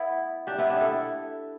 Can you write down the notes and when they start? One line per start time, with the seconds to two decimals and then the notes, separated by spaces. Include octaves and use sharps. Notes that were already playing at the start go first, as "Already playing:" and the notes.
Already playing: B3 E4
0.47 D4 G4
0.58 B3 E4
0.69 D4 G4
0.81 E4 A4